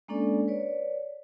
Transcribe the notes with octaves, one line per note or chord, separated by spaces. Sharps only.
G#3 A#3 C#4 D4 A4 D5
B4 C#5 D5